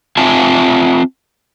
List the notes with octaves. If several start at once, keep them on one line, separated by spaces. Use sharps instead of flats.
C4 F4 E5 G#5 A5